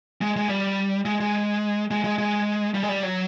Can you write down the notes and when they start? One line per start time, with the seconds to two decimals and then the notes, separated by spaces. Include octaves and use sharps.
0.21 G#3
0.36 G#3
0.49 G3
1.05 G#3
1.20 G#3
1.91 G#3
2.04 G#3
2.18 G#3
2.74 G3
2.83 G#3
2.89 G3
3.03 F#3